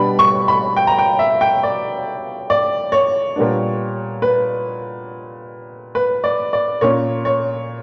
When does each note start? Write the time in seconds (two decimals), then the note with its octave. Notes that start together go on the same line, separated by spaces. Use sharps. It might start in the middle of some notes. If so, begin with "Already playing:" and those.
Already playing: B2 G3 B3 D4 B5
0.19 C#6
0.48 B5
0.77 G5
0.87 A#5
0.98 G5
1.19 E5
1.41 G5
1.63 D5
2.50 D5
2.92 C#5
3.36 A#2 G3 B3 D4
4.22 B4
5.95 B4
6.24 D5
6.53 D5
6.81 A#2 A#3 C#4 C#5
7.25 C#5